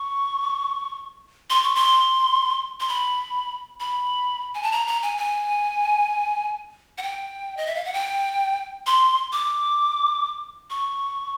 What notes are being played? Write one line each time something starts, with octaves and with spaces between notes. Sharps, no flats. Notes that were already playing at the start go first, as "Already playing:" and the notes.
Already playing: C#6
C6
C#6
C6
C6
B5
B5
G#5
A5
A#5
A#5
G#5
G#5
F#5
G5
D#5
E5
F5
F#5
G5
C6
D6
C#6